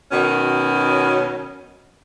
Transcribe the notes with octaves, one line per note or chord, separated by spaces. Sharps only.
B2 D#3 F#3 C#4